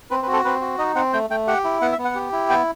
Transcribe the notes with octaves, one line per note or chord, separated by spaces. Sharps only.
C4 B4
B4
F#4
A4
C4 B4
F#4
D#4 D#5
C4 F#5
A3 G5
A3 G5
G4 F#5
E4
B3 F#5
E5
B3
F#5
G4
E4
B3 G5